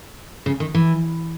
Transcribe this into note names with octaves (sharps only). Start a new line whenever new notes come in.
C#3
D#3
E3